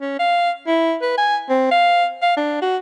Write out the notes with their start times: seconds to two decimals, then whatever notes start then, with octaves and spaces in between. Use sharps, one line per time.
0.01 C#4
0.19 F5
0.67 E4
1.02 B4
1.18 G#5
1.49 C4
1.71 F5
2.22 F5
2.37 D4
2.62 F#4